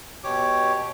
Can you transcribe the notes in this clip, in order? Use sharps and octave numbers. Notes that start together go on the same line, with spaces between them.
B2 G4 C#5 D6